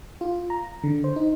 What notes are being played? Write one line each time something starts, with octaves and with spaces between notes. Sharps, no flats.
F4
A#5
D3
C5
D#4